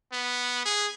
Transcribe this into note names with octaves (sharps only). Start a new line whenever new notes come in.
B3
G#4